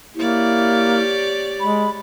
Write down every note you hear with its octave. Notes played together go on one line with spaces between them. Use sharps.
A#3 E4 G4 C#5 D5
G#3 B5